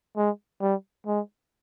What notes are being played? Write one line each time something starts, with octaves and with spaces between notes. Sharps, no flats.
G#3
G3
G#3